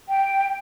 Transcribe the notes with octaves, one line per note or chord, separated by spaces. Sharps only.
G5